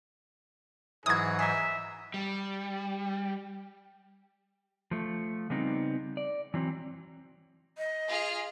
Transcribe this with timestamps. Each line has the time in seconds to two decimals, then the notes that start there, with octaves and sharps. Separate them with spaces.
1.06 G#2 E3 F#3 E4 F#4 G#4 D#6 G#6
1.39 D#4 G#4 E5
2.14 G3
4.91 F3 A3
5.50 C#3 G3 B3 C4 D#4
6.17 D5
6.54 E3 F#3 C4
7.78 D#5
8.07 F4 G#4 F6